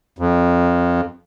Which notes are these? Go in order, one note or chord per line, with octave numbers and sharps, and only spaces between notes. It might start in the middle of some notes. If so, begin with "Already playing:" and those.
F2